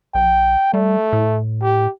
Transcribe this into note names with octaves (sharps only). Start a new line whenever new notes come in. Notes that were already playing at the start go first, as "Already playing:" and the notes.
A#1 G5
G3 A3
A2
G4